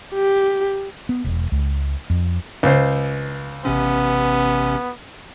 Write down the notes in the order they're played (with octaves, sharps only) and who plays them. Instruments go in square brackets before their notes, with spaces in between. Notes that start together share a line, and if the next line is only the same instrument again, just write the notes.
[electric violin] G4
[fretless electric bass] B3
E1
C#2
F2
[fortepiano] C#2 C5
[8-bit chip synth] A1 C3 C#4 [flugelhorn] B3